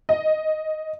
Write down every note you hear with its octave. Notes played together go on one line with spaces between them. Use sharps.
D#5